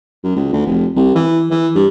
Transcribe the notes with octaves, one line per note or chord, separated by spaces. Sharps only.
F#2
C#2
D2
F1
C2
E3
E3
G2